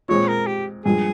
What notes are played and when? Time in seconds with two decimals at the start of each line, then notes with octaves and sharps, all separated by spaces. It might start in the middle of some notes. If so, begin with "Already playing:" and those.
0.09 A#2 G#3 C4 C#5
0.28 A#4
0.47 G4
0.85 G2 F3 G#3 G#4